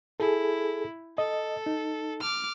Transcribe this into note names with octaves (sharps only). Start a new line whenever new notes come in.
E4 G#4 A4
A4 D#5
D#4
D6 F6